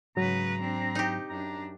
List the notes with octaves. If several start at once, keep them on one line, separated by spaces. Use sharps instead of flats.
G#2 C#3 F#3 B4 A#5
C4 D4
D#4 G4
F#2 D4 A#5